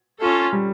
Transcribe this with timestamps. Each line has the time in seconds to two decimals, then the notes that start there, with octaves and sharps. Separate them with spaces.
0.21 C#4 F4 A4
0.53 G3